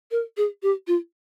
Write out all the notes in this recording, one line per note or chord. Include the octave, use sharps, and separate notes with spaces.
A#4
G#4
G4
F4